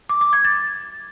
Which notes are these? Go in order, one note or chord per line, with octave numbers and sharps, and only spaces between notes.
D6
D6
G#6
A6